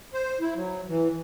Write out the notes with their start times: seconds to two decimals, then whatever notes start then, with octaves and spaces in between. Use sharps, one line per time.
0.14 C5
0.41 E4
0.56 F#3
0.88 E3